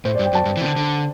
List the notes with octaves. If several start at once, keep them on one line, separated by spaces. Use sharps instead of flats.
A2 C5
G2 D5
G5
F#2 A5
G2
E3
C3
D3
D3